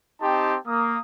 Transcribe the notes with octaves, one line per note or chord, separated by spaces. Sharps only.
C4 D#4 G4 G5 A5 C6
A#3 D#6